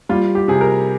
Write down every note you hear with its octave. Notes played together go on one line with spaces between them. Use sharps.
G3 F4
G4
C3 G#4
A#4